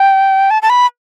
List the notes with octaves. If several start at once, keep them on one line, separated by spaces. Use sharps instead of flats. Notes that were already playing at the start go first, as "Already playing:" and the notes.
Already playing: G5
A5
A5
B5